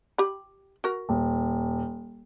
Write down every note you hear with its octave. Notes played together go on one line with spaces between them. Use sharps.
G4 B5
F#4 A#4
D#1